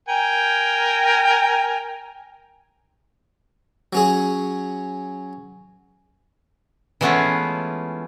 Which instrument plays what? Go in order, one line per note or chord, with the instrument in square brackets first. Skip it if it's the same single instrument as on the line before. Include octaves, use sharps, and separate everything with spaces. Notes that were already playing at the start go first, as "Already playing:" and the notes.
[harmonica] A#4 G5 G#5
[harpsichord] F#3 C#4 G#4
[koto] E3 G#3 A3 B3 C#4 F4